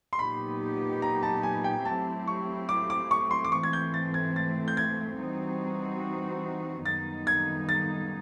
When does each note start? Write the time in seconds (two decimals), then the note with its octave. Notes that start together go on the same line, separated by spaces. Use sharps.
0.13 C6
0.19 A#2 F#3 B3 D#4 G4 B5
1.02 A#5
1.23 A5
1.43 G#5
1.64 G5
1.85 F#3 A3 C4 E4 G4 A5
2.27 C#6
2.69 D6
2.90 D6
3.11 C#6
3.31 C6
3.45 D6
3.52 G#2 E3 A3 C4 C#6
3.63 G#6
3.73 G6
3.94 A6
4.14 G#6
4.36 A6
4.68 G6
4.77 G#6
5.19 E3 G3 C4 D#4 F#4
6.86 F#2 D#3 G3 B3 D#4 A6
7.27 G#6
7.69 A6